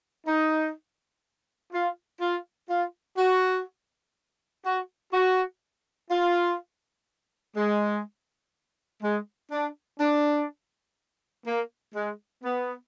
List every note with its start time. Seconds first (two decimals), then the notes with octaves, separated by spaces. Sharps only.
0.26 D#4
1.72 F4
2.21 F4
2.70 F4
3.18 F#4
4.65 F#4
5.13 F#4
6.11 F4
7.56 G#3
9.03 G#3
9.51 D4
10.00 D4
11.46 A#3
11.95 G#3
12.43 B3